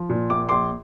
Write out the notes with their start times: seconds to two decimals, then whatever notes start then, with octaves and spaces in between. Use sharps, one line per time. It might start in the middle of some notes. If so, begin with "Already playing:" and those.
Already playing: F3
0.09 A#2
0.30 A#1 D6
0.49 A#1 C6 D6